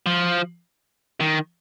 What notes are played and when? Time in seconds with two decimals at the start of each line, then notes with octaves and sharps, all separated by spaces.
0.06 F3
1.20 D#3